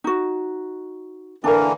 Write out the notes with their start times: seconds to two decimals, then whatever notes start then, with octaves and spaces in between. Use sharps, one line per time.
0.04 D#4 F#4
1.44 D3 E3 A#3 D4 A#4